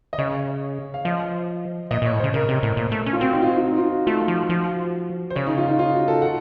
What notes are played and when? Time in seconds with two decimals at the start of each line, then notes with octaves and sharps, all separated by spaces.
0.13 D#5
0.18 C#3 C#5
0.94 F5
1.05 F3 D#5
1.91 A#2 D#5
2.02 A#2
2.06 C#5
2.12 A2
2.20 C#3 C5
2.34 C#3 A#4
2.49 C3
2.63 A2
2.77 A#2
2.92 A3
3.06 C#4
3.13 F4
3.21 C4 F#4
3.33 D#4
3.42 F4
3.57 F4
3.64 F#4
3.71 D#4
3.78 F4
3.92 F#4
4.06 A3 F4
4.28 F3
4.49 F3 F#4
5.30 C5
5.36 C#3 C#5
5.47 D#4
5.58 F4
5.68 D#4
5.79 F4
5.94 F#4
6.08 A4
6.22 F#5